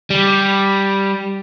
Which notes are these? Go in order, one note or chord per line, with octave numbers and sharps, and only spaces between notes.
G3